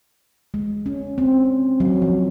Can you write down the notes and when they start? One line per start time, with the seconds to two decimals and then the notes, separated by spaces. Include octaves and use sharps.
0.54 G#3
0.86 C#4
1.18 C4
1.80 F#3
2.02 F3